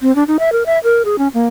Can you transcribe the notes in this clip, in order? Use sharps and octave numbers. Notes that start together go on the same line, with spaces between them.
C4
D4
D#4
E5
A#4
E5
A#4
G#4
C#4
A#3